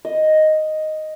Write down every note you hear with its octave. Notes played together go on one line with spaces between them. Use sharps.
D#5